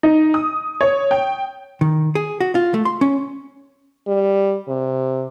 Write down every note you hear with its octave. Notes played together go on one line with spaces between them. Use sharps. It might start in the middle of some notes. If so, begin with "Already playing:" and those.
D#4
D#6
C#5
G5
D#3
G#4
F#4
F4
A3
C6
C#4
G3
C3